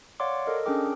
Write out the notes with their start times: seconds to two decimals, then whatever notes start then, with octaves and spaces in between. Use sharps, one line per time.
0.20 C#5 D5 F5 F#5 C6 D6
0.46 A4 A#4 D#5
0.66 C#4 D4 G#4 A#4 G5 D6